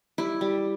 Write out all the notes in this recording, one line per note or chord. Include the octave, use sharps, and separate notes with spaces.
G3 E4
G3